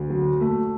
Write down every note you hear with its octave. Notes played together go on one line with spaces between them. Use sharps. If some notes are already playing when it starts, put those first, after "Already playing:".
Already playing: D2
F#3
A3